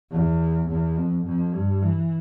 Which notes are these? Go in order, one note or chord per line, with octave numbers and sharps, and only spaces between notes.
E2
E2
F2
F2
G2
E3